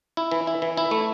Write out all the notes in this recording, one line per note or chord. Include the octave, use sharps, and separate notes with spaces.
E4
E3
E4
E3
E4
A3